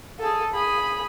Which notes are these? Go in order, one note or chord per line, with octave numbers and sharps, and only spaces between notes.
G#4 A4
G#4 B5